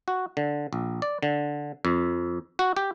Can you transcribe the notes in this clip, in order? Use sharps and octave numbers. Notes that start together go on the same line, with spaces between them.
F#4
D3
A#1
D5
D3
F2
F#4
G4